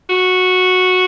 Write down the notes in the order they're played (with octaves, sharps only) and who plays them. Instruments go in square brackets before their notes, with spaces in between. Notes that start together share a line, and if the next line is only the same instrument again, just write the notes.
[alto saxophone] F#4